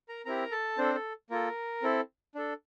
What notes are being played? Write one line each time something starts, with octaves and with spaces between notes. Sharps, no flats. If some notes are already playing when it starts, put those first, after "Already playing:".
A#4 A#5
C4 E4 G4 A#4 A#5
A4 A5
C4 D4 A4 C5
A4
A#3 F4 A4 A#4
C4 E4 A4
D4 A4